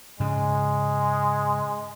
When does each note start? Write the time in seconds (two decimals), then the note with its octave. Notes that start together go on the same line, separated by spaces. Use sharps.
0.20 G#2 C#3 G#3